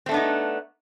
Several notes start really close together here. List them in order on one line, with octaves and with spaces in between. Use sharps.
C4 A3 D4 B3 D#4